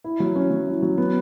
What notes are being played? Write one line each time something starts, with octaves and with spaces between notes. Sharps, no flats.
E4
F#3
C#4
F#3
E4
F#3
B3